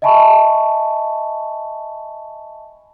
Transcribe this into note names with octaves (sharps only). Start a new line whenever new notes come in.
D#5 E5 G#5 A5 B5 C#6